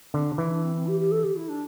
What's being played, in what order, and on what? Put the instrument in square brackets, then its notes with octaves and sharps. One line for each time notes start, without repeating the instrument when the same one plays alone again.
[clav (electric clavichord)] D3 [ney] C4
[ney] D4
[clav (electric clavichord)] E3 [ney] E4
[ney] D4
C4
C4
G4
G4
A4
G4
E4
D4